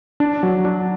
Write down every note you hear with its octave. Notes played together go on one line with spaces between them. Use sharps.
D4
F#3
D4